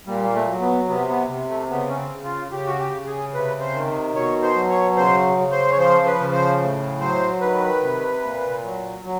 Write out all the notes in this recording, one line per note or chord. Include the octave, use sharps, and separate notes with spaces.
A#2 G3
A#3
A3
F#3
B3
C3 B3
B3
C3
A3
C#3 B3
C#4
C4
C#3
F4
C#3 G4
F#4
G4
C#3
G#4
C3 B4
C5
D#3
B2 C#5
C5
F#3
C#5
C#3 C5
C#3
C5
C#5
F3 C5
B4
C#3
C5
A2
F#3 C5
D#3 B4
C3
A#2
F#3
F#3